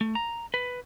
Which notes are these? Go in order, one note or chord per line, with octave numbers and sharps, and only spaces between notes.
A3
A#5
B4